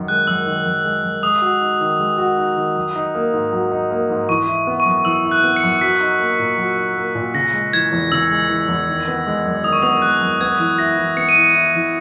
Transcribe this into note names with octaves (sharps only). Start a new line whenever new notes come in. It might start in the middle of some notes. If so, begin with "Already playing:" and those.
Already playing: F#2 D#3
G#3 F#6
F#2 E6
D#3
F#2
G#3
F#2
G#3 D#6
F#4
D#4
D#3
G#3
F#4
D#4
D#3
F#3
D#4
A#3
G#2
F#3
D#4
A#3
G#2
E3 C#6
E4
B3
C#6
F#2
E3 E6
E4
F#6
B3
C#7
F#2
F#3 B6
D#4
A#3
A#2
F#3
D#4
A#3
A#2
C#3 A#6
G#3
E3 G#6
E2
C#3 E6
G#3
E3
E2
D#3
B3
G#3
F#2
D#3 D#6
C#6
B3 D#6
G#3 F#6
F#2
B3 G#6
E3
E4 A#6
E3
B3 C#7
D#7
E3 C#7
E4
E3